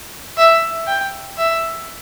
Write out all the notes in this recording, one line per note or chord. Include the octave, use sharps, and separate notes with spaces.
E5
G5
E5